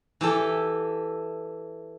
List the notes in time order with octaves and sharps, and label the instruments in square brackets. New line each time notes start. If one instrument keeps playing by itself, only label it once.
[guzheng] E3 G4 A4